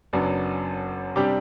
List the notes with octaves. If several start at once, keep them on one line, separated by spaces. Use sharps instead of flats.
F#1 F#2 F#3 B3 D4
C3 G3 D4 G4